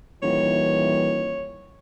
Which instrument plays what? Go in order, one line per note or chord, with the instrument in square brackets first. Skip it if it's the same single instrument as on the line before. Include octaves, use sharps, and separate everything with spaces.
[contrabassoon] D#1 [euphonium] E3 [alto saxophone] C#5